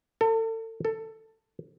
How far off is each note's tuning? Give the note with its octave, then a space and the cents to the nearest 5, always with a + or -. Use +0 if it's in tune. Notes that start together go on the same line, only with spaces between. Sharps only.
A4 +35
A4 +15